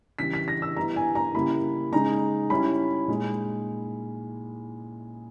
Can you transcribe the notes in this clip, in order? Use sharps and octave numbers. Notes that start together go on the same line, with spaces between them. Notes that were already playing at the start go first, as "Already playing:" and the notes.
C#3 E3 G3 B6
B6
A#6
E6
G3 B3 E4 A#5
G#5
A#5
C#3 G3 A#3 E4 B5
C#3 G#3 D#4 A#5
G3 C#4 E4 B5
A#2 G#3 D#4